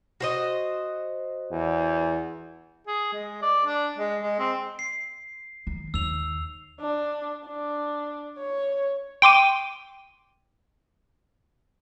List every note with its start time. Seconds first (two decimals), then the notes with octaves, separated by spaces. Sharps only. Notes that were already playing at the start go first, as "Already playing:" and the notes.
0.20 F#4 C5 D#5
1.51 E2
2.87 G#4
3.13 G#3
3.42 D5
3.66 D4
3.98 G#3
4.21 G#3
4.39 C4
4.79 C7
5.67 D#3
5.94 D#2 E6 F7
6.80 D4
7.46 D4
8.39 C#5
9.22 G5 C6 D6 D#7